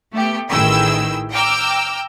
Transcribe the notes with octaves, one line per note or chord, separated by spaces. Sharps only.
A3 B3 G4
A1 D#3 E4 G#4 G5 E6
G5 A#5 D6 E6 F6